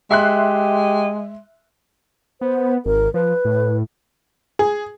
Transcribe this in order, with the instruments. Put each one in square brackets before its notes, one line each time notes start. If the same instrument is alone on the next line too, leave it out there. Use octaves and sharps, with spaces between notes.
[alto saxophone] G#3 [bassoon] G4 [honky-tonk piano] E5 C6 F#6
[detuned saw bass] B3 [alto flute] C5
[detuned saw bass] G#1 [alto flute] A#4
[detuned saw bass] F3 [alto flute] B4
[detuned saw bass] A2
[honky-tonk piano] G#4